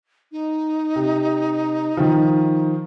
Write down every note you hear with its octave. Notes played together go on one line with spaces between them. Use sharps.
D#4
C3
D#3 F3